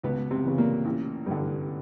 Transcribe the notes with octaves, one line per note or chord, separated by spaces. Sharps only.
C#2 B2 B3
C3 C4
C#3 E3
A#2 A#3
A1
G2 D3